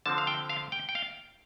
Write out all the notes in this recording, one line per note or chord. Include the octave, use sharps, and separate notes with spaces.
D3 F3 C4 A5
F5
G5
F5
G5
G5
F5